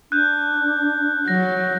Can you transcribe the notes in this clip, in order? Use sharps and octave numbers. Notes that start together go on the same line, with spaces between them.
D4 F#6 G6
F#3 A#6